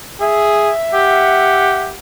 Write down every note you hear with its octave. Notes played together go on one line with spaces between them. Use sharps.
G#4 E5
G4 F#5